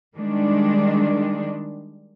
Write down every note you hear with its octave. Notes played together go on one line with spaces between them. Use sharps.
D#3 G3 G#3 D4